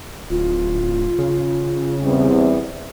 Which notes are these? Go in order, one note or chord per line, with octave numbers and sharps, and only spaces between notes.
D1 F4
C#3
E2 G3 C4